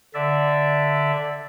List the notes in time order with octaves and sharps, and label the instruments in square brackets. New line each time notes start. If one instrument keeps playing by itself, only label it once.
[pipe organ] D3 D5 E5